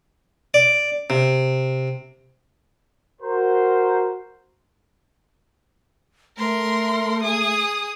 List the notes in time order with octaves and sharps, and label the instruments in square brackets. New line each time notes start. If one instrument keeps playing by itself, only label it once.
[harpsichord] D5
C3
[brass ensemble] F#4 A#4 C5
[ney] A3 [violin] A#4 C6
[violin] G#4 D#6